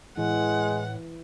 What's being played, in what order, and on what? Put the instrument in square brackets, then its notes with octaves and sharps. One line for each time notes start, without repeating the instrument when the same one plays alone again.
[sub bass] A2 [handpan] E3 [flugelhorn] G#3 [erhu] F#5